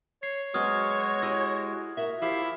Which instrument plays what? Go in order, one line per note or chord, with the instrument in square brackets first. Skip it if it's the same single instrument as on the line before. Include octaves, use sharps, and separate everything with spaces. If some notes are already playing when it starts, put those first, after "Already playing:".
[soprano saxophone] C#5 [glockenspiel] C7
[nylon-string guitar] F#3 B3 C4 [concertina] G#3 F#4 [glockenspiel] D#6 F6 G#6
[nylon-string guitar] E4 G4 G#5 [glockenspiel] C#6 E6 A#6
[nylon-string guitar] F#4 A#4 E5
[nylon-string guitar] F3 [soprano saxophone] E4 [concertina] G4 F5